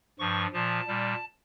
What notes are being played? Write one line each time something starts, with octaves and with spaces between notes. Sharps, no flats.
G2 F3 C#6
A#2 F3 A5
A#2 G3